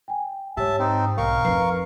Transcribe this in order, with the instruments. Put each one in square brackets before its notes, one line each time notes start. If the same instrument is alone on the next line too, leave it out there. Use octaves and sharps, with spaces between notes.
[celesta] G5 G#5
[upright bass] G#2 [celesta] G4 C#5 [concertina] E5 A5
[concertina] C4 D#4 [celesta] G5
[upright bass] B1 [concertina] A#4 F5 C#6
[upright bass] F2 D#4 [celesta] B4 C7